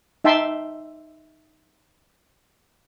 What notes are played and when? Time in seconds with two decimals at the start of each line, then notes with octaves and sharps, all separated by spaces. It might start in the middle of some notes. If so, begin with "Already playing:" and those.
0.24 D#4 E5 G5 A5 C6